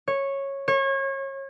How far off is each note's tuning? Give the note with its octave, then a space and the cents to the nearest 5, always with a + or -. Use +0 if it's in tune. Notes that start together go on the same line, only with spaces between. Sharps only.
C#5 -10
C#5 -30